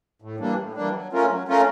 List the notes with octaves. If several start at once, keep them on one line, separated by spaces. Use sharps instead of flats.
A2
E3 G3 A#3 D4
A2
E3 G3 A#3 D4
F#3
A3 C#4 F4 A#4
F#3
A3 C#4 F4 A#4